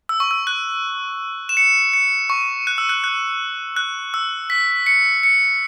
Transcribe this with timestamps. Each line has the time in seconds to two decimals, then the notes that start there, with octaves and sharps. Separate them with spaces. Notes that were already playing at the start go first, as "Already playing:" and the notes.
0.09 E6
0.20 C#6
0.31 E6
0.47 F#6
1.49 E7
1.57 C#7
1.93 C#7
2.30 C#6
2.67 F#6
2.78 E6
2.89 F#6
3.04 F#6
3.76 F#6
4.14 E6
4.50 B6
4.86 C#7
5.23 C#7